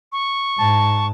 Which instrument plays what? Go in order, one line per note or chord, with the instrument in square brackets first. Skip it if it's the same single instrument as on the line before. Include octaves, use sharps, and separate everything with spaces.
[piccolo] C#6
[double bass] G#2 [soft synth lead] A5